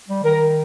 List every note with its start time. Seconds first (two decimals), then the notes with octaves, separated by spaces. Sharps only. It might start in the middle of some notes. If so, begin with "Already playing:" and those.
0.08 G3
0.24 D#3 A#4